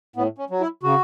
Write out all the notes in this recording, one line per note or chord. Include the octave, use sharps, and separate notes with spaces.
A2 B3
C#4
F#3
E4
C#3 F#4